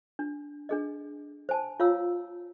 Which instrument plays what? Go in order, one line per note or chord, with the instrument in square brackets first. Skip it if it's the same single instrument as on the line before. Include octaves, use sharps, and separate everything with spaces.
[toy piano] D4
D4 G#4 D#5
C5 G#5 A5
F4 C#5 F5 A#5 E6